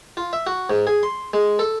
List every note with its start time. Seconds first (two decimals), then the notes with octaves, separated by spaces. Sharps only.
0.17 F4
0.33 E5
0.47 F#4
0.70 G#2
0.87 G#4
1.03 C6
1.33 G#3
1.59 A4